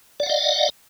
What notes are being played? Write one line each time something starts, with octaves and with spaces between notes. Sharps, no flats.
D5 D#5 F5 F#5